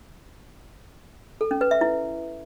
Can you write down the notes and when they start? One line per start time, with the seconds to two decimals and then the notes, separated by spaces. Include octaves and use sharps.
1.41 A4
1.51 C#4
1.61 B4
1.71 E5
1.81 E4